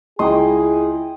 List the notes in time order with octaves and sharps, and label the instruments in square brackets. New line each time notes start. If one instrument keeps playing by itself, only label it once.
[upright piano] C#2 C6 [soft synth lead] E4 [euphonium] G#4 [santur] D#5 G5